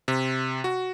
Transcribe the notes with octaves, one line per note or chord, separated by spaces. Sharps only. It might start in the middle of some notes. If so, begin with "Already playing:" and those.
C3
F#4